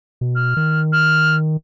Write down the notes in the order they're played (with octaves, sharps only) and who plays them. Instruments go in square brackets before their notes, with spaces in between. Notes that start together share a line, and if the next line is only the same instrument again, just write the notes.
[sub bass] B2
[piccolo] F6
[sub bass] D#3
[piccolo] F6